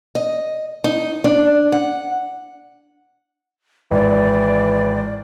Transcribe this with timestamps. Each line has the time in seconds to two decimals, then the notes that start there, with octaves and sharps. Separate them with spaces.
0.15 D#5
0.84 D#4
1.24 D4
1.72 F#5
3.91 G#1 E3 D5